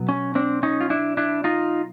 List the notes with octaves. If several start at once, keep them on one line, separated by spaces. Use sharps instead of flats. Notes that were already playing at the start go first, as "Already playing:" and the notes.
Already playing: B2 F#3 B3
C#4
C4 D4
C#4 D#4
F4
D4 E4
D4 E4
D#4 F4